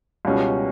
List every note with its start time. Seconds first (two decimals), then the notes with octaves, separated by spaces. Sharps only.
0.25 C#2 B2 G3 C#4